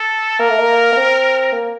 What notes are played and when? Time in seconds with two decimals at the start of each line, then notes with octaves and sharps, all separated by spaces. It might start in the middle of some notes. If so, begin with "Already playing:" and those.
Already playing: A4
0.39 A#3 A#4
0.49 A3
0.59 A#3
0.92 A#3
0.96 C4
1.52 A#3